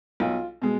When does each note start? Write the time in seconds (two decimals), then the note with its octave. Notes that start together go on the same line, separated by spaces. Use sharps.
0.20 B1 F4
0.62 B2 G#3